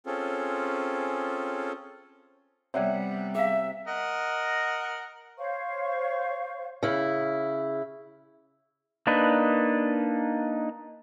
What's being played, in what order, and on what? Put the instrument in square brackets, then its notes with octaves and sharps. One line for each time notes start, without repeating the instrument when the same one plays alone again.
[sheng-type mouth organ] C4 C#4 F4 G#4 A4
[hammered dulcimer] C3 F#5 [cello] G3 B3 [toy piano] C#5 D5
[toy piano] G#4 F5 [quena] E5
[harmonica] A#4 D#5 F#5
[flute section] C5 C#5 F5 C#6
[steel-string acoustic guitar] C#3 E4
[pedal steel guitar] A#3 D4 D#4 B4